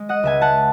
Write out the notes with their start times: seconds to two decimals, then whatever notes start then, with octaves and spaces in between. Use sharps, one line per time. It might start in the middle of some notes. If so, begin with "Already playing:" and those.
Already playing: G#3
0.09 D#5 F#5
0.23 C#2 E5 G#5
0.41 F#5 A5